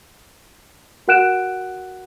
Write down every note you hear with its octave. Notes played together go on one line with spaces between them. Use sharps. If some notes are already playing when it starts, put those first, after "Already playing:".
F#4 A#4 F#5 F#6 D7 E7